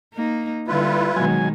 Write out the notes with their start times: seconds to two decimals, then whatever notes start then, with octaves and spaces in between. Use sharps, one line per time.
0.14 A#3 D#4
0.68 D3 G3 E4 F4 B4
1.16 B2 D#3 F#3 G#3 G#5